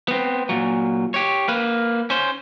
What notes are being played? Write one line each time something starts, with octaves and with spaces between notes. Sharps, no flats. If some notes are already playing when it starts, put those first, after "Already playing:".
B3 C4
A#2 F#3
G4 C#5
A#3 B4
C#4 C5